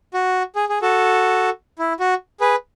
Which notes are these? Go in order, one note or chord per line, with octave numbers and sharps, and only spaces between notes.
F#4
G#4
G#4
F#4 A4
E4
F#4
G#4 B4